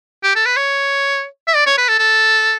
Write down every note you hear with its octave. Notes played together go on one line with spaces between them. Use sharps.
G4
A4
B4
C#5
E5
D5
C#5
B4
A4
A4